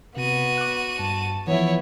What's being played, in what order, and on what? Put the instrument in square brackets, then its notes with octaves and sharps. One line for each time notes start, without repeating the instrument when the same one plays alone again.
[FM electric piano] C3 [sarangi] B3 [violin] F#4 D#7
[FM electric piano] D6 F#6
[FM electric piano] G2 [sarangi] A5
[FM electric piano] E3 F3 [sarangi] B3 [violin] E4 C#5